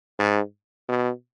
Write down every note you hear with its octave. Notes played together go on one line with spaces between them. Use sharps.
G#2
B2